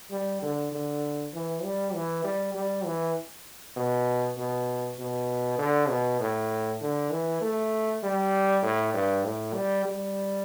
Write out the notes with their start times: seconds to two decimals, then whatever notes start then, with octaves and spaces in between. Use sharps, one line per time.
0.11 G3
0.42 D3
0.72 D3
1.34 E3
1.64 G3
1.94 E3
2.24 G3
2.55 G3
2.85 E3
3.76 B2
4.38 B2
4.99 B2
5.58 D3
5.89 B2
6.20 A2
6.81 D3
7.11 E3
7.42 A3
8.03 G3
8.63 A2
8.94 G2
9.24 A2
9.54 G3
9.85 G3